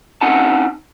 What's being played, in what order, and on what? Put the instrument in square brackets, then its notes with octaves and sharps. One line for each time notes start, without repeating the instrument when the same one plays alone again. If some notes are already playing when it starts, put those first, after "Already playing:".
[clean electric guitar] C4 C#4 D#4 F#5 G#5 A5